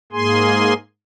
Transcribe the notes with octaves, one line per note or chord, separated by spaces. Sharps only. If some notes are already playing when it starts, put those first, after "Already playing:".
G#2 A#3 G#4 G#5 C6